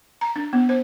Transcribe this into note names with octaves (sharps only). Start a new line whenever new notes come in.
A#5
D4
B3
C5